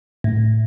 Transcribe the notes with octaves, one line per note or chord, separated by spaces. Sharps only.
A2